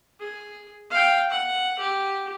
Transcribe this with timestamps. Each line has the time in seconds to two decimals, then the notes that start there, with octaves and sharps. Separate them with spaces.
0.20 G#4
0.90 F5 G5
1.30 F#5
1.79 G4